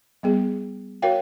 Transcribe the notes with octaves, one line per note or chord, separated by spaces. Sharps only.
G3 B3 G#4
F#4 A#4 C#5 F5 G5